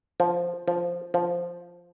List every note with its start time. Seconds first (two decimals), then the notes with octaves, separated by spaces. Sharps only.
0.20 F3
0.68 F3
1.14 F3